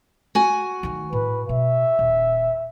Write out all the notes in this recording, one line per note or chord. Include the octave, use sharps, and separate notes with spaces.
F#4 G#5
D#3 A3
A2 B4
B2 E5
D#1